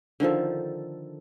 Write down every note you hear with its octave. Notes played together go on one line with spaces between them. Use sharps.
D3 D#3 F3 A4